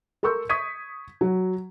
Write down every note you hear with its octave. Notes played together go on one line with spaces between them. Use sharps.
A4 A#4 C6 C#6 E6 G6
C#6 D#6 G#6 B6 D#7
F#3 F#4